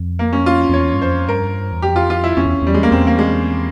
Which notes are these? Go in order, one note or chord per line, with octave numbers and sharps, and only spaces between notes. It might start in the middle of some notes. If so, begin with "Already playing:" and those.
Already playing: F2
A#3
C#4
F4
F2
E2 C#5
G2
F2 C5
G2 A#4
E2
F2 G4
F4
F4
E4
F2 C#4
E2
E2 G3
G#3
A#3
E2 C4
A#3
G#3